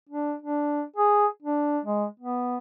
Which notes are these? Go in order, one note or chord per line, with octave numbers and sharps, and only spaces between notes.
D4
D4
G#4
D4
G#3
B3